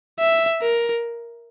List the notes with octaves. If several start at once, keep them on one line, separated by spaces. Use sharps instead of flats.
E5
A#4